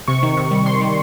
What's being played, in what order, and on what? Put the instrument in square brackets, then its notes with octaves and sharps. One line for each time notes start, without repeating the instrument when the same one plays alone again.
[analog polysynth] C3 C#6
D#3
C3
G3
C3 C6
G3